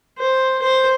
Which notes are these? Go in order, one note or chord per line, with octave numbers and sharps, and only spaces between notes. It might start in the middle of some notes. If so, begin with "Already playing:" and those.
C5
C5